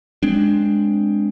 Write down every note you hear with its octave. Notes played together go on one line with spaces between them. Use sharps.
G#3 C4 D4